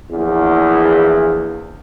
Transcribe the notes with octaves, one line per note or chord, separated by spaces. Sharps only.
A#1 E2